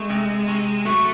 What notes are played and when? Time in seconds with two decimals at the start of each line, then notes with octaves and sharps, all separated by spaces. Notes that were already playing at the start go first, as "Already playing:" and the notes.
Already playing: G#3 A3
0.10 C3
0.48 C3
0.85 F#3 A3